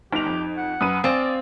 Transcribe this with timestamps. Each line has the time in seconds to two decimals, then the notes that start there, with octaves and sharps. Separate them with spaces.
0.13 G1 D#4 G4 D7 F7
0.26 F2
0.57 F#5
0.81 F#2 B4 D#6 D#7
1.04 C4 D5 F5 G#5 A6